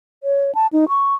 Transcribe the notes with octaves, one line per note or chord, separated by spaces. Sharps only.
C#5
A5
D#4
C#6